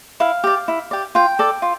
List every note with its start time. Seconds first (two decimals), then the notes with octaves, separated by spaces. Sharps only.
0.20 E4 F5
0.44 G4 D5
0.68 E4
0.91 G4 D5
1.15 F4 G5
1.39 A4 D5
1.62 F4